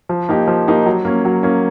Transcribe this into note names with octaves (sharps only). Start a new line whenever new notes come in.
F3
A#3 D#4 G4
F3
A#3 D#4 G4
F#3
A#3 C#4
F#3
A#3 C#4